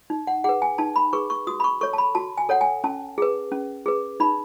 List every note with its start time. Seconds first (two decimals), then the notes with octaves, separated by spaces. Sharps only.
0.10 D#4
0.27 F#5
0.44 G#4 B4 F#5
0.62 G#5
0.78 D#4 A5
0.96 B5
1.13 G#4 B4 C#6
1.30 C#6
1.47 F#4 D#6
1.60 B5
1.64 C#6
1.81 A4 C#5 C#6
1.93 A5
1.98 B5
2.15 F#4 A5
2.38 G#5
2.49 A4 C#5 F#5
2.61 G#5
2.84 C#4 A5
3.18 G#4 B4
3.52 C#4
3.86 G#4 B4
4.20 D#4 B5